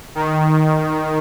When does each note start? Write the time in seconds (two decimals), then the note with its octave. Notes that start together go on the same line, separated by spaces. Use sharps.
0.15 D#3